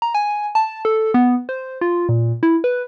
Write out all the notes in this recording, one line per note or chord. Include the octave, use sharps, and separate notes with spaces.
A#5
G#5
A5
A4
B3
C5
F4
A#2
E4
B4